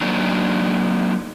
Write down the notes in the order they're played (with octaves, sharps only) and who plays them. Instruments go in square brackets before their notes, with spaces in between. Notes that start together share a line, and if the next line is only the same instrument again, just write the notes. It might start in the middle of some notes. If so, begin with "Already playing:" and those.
[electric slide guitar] F#3 A#3 C4 D4 D#4